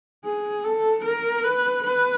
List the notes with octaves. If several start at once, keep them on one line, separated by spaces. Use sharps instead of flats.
G#4
A4
A#4
B4
B4